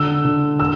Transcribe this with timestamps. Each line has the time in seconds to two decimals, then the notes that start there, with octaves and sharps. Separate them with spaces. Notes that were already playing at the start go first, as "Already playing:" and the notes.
Already playing: D3 E6
0.25 D3
0.60 E6